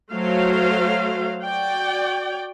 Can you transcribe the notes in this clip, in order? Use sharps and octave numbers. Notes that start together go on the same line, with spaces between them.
F#3 A3 C5 F5
F#4 D5 G5